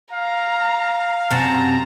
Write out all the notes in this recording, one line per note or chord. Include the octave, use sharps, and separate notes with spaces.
F5 A#5
F#2 C3 A5 A#5